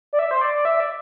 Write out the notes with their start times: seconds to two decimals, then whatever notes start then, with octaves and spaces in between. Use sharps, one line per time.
0.13 D5
0.19 E5
0.31 C5
0.41 D5
0.65 E5
0.80 D5